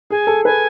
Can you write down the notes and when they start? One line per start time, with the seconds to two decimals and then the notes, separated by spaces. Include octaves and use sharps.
0.10 G#4 G#5
0.27 A4
0.45 B4 G#5